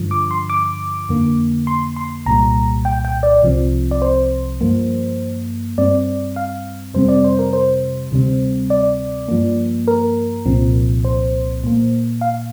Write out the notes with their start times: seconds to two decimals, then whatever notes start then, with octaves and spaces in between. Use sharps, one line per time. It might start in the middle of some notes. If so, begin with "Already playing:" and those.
Already playing: G2 D3 F3
0.11 D6
0.31 C6
0.50 D6
1.09 F2 D3 A#3
1.67 C6
1.96 C6
2.26 C2 A#2 G3 A#5
2.85 G5
3.05 G5
3.23 D5
3.43 C2 C3 F3 C4
3.91 D5
4.02 C5
4.61 G2 F3 A#3
5.78 G2 G3 C4 D5
6.36 F5
6.94 F2 C3 G3 C4 C5
7.09 D5
7.24 C5
7.39 A#4
7.53 C5
8.12 D2 C3 G3 C4
8.70 D5
9.28 G2 F3 A#3
9.87 A#4
10.46 C2 A#2 F3 C4
11.05 C5
11.64 A#2 A#3
12.21 F5